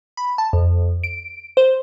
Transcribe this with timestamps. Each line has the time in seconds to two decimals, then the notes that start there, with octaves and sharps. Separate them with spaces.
0.17 B5
0.38 A5
0.53 F2
1.04 D7
1.57 C5